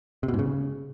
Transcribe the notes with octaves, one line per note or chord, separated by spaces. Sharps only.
C3
B2
G#2
C#3